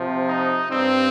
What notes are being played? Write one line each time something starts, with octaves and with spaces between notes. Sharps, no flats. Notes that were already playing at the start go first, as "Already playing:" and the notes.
Already playing: C3 F3
D#4
G2 G3 C4